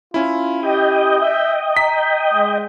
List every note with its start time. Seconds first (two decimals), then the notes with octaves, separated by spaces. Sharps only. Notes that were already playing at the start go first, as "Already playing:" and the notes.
0.14 C#4 E4 F4
0.63 G4 D#5 G5
1.21 E5
1.77 A#5 B6
2.34 G#3